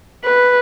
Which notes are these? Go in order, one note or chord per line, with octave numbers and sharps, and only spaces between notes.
B4